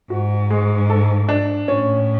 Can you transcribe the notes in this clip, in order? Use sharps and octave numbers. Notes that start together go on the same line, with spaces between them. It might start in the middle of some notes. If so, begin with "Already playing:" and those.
G#2 F#4
G#3
A4
D4
A2 C#4